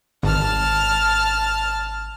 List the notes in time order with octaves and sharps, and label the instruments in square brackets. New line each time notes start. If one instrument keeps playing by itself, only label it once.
[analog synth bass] G#1 [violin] A5 F6